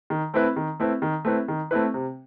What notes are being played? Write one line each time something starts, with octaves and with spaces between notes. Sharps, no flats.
D#3
A3 C4 E4 B4
D#3
A3 C4 E4 B4
D#3
A3 C4 E4 B4
D#3
A3 C4 E4 B4
C3